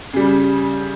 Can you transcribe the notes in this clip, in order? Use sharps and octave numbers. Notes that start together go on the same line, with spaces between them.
C#3 G3